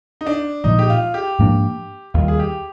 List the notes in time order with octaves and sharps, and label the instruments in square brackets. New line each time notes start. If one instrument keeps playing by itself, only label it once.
[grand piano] D#4
D4
[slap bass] A#2 F3 G#3 [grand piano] D#4
[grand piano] G4
F4
G4
[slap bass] G#2 F3 A#3 D4
[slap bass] D#2 D#3 G3 [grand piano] F4
[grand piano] G#4
G4